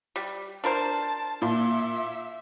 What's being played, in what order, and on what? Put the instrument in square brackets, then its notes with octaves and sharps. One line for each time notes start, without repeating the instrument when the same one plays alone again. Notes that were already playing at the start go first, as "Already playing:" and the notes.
[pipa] G3
[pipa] D4 A#4 C5 [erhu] A5
[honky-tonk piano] A#2 [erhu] E5